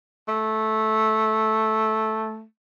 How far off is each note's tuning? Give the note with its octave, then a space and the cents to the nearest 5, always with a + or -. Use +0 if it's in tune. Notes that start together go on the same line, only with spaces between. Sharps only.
A3 -10